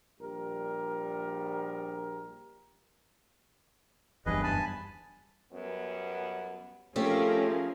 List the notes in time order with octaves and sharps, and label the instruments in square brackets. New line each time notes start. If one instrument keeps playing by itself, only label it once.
[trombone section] A#1 G3 A#4
[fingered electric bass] F#1 E2 G2 [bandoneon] G#4 B4 D#5
[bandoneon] G#5 A5 B5
[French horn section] F#2 G3 B3
[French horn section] F3 [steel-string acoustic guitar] A3 C4 G4 [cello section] C#4 G#4 A#4